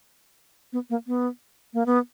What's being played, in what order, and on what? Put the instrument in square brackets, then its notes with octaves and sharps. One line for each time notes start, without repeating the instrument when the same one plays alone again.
[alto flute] B3
A#3
B3
A#3
B3